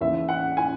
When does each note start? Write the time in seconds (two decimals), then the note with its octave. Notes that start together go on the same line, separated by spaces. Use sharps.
0.01 D#2 C#3 E3 E5
0.29 F#5
0.57 G#5